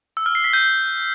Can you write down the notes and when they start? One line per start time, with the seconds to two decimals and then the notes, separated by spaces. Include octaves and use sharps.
0.17 E6
0.26 F6
0.35 C7
0.44 B6
0.53 G6